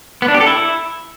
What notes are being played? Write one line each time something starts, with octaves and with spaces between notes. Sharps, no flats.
B3
D4
G4
A4
E4